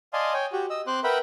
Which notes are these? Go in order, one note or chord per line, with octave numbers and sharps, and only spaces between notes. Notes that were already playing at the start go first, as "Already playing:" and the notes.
D5 D#5 F5 G#5 A5 C6
C#5 G5 G#5
F#4 G4
D#5 E6
C4 C5 C6 D6 F#6
A#4 B4 E5 F#5 G5 B5